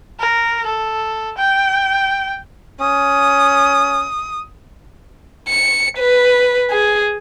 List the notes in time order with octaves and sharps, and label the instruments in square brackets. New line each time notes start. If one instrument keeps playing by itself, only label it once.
[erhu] A#4
A4
G5
[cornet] C#4 [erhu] D#6
[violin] C#7
B4
G#4